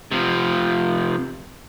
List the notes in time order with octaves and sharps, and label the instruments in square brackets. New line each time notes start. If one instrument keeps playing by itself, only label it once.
[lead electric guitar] C3 F3